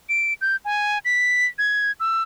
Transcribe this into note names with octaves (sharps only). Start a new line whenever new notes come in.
D7
G6
G#5
B6
G#6
E6